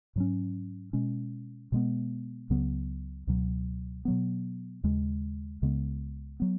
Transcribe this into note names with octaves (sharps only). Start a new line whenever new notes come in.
G#2 F#3 C#4
B2 G#3 C#4
B2 G#3 B3
C#2 C#3 F#3 B3
C#2 B2 F#3
B2 F#3 B3
D#2 C#3 G#3
C#2 C#3 G#3 B3
F#3 B3